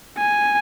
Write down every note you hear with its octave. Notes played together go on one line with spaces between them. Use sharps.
G#5